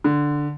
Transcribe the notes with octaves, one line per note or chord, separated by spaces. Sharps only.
D3